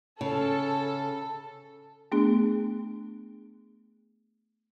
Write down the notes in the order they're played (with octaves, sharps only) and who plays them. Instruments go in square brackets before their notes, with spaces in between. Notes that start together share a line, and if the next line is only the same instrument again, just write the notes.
[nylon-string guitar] C#3 [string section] A4
[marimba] A3 B3 D4 G#4